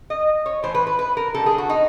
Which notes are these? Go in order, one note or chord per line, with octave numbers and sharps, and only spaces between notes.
D#5
C#5
A2 E3 A3 C5
B4
B4
B4
A#4
D3 G3 A4
G#4
F#4
D#4